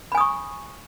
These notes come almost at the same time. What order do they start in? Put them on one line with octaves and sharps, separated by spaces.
B5 G#5 D#6 C#6